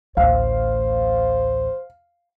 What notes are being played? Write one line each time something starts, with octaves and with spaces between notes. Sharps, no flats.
A1 D2 C5 F5